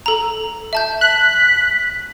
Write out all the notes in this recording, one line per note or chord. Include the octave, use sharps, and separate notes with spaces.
A4 A#5
E5 A5 G6
F#6 B6